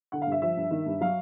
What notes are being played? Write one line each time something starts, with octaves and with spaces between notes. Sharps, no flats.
D3 F#5
F5
G2 E5
F3 E5
G2
D#3
G2
F#3 F5